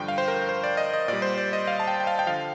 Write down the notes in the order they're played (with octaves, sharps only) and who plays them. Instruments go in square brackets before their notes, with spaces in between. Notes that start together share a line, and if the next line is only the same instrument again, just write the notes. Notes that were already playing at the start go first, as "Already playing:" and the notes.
Already playing: [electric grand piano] G2 D3 F3 G5
F5
C5
A#4
C5
D5
D#5
D#5
A#2 G3 D5
C5
D5
D#5
F5
A5
G5
G5
F5
G5
D3 F3 F5